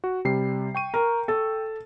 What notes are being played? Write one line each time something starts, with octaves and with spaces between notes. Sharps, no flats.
F#4
C3 G3 C7
G5 C#6 D#7
A#4
A4